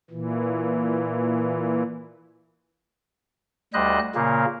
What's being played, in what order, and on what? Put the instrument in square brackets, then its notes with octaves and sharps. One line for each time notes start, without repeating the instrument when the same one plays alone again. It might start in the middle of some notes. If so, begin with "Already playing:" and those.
[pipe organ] A#2 E3
D2 G3 C5 D#5 F#6
A#2 C#3 A#3